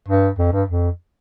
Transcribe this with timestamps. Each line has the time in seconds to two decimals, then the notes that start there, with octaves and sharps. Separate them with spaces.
0.08 G2
0.38 F2
0.53 G2
0.68 F2